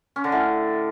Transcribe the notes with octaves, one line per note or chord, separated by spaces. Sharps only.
C#4
D3
A2